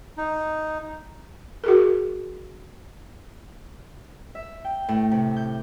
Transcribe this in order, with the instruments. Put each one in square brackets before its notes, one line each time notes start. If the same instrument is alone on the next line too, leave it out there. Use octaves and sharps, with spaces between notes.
[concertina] D#4
[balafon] F#4 G#4 A#4
[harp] E5
G5
A2
C3
G6